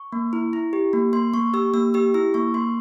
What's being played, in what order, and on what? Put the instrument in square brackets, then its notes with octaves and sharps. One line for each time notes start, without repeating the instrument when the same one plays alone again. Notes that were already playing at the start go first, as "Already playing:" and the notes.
Already playing: [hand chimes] C#6
A#3
E4
E4
G4
A#3
A#3 C6
A#3 C#6
G4 E6
A#3 E6
G4 E6
E4 E6
A#3 C#6
A#3 C6